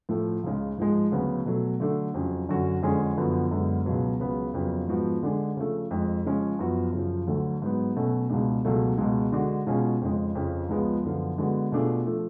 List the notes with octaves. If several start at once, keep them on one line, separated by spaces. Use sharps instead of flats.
A2 F3 A3
C#2 C#3 G#3
G#2 F3 G#3
D2 C#3 F#3 B3
B2 F#3 A3
D3 F#3 A3 D4
F2 C#3 F#3 C#4
F#2 D3 F#3 C#4 F#4
F2 D3 G#3 C#4 G#4
F#2 D3 F3 B3 F#4
F#2 D3 G#3 B3
C#2 B2 F#3 B3
C#2 C#3 F#3 B3
F2 C#3 F#3 B3
G#2 F3 B3 F#4
D3 G#3 D4 G#4
C#3 F3 A3
F2 F3 G#3
C#3 F3 G#3 C#4
F#2 F3 B3 F#4
F#2 C#3 F3
D2 D3 F#3 A3
G#2 F#3 B3
B2 F#3 A3 C#4
C#2 B2 G#3 D4
C#2 B2 F#3 A3
C#2 B2 G#3
D3 G#3 D4 F#4
B2 G#3 C#4 F4 G#4
F2 C#3 G#3
F2 C#3 F3
C#2 C#3 F3 G#3 B3
F#2 D3 F3 B3 F4
D3 G#3 B3 F#4
B2 A3 D4 F4 G#4
F3 A3